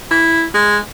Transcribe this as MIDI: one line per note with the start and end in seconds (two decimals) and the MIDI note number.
0.11 0.45 64
0.54 0.78 56